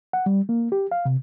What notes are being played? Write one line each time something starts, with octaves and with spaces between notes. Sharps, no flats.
F#5
G3
A#3
G4
F5
C3